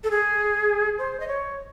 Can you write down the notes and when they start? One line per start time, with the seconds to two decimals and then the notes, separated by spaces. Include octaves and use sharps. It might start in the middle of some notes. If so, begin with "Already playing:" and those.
0.04 A4
0.11 G#4
0.98 C5
1.20 D#5
1.28 C#5